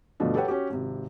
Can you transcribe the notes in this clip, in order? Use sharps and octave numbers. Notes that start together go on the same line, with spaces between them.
G1 B2 F3 A3 D4 D#5
G4 A4 B4 C#5 F#5 G5
C#4 F#4 G4
G#1 C3